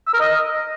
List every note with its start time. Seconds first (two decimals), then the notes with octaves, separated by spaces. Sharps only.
0.07 E6
0.14 A#4
0.20 D#5